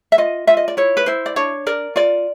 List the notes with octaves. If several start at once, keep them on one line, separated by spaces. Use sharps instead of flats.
E5
F4 D#5
F4 E5
D#5
D5
E4 C#5
B4
E4 C5
D5
D4 C#5
A#4 D5
F4 D5